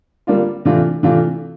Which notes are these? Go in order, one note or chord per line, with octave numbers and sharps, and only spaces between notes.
D3 G3 A#3 D4 F4
C3 E3 A3 D4 F4
C3 E3 A3 D4 F4